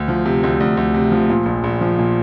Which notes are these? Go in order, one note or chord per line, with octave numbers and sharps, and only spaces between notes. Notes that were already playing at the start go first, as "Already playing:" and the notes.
Already playing: D2
F3
C3
D2
D2
D2
C3
F3
A#2
A#1
A#1
F3
A#2